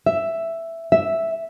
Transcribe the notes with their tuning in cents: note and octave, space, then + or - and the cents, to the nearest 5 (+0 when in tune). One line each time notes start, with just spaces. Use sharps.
E5 +5
E5 +0